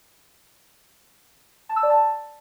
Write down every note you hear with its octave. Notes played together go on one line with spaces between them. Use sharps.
A5
E6
D5
A5